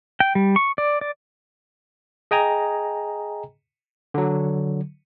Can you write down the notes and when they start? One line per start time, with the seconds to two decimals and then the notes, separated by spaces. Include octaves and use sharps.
0.20 G5
0.35 G3
0.56 C#6
0.78 D5
1.01 D5
2.31 G#4 D#5 G5 G#5 A#5
4.14 D3 F#3